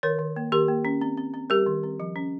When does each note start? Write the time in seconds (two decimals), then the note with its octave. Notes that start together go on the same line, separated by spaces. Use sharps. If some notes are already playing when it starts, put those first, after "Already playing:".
0.03 D#3 A#4 C#5
0.19 D#3
0.36 A#3
0.52 D#3 G4 A#4
0.68 A#3
0.85 C#4
1.01 C4
1.17 C4
1.34 C4
1.50 G3 G4 A#4
1.66 D#3
1.83 C4
2.00 F3
2.16 C#4